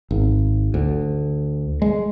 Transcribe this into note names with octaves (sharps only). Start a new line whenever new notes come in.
G#1
D2
G#3